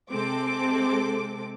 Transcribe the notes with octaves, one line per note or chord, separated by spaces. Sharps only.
C3 G#3 C4 A4 D6